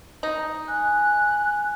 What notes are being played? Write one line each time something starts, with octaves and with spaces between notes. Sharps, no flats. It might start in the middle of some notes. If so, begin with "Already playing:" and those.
D#4
G#5 F#6